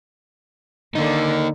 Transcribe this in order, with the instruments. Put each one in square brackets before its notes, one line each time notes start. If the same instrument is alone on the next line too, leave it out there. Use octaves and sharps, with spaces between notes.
[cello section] D3 [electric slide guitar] A#3 D#4